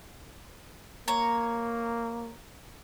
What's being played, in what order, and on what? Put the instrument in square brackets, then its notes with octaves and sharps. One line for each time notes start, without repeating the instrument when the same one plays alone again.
[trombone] A#3 [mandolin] C#5 A#5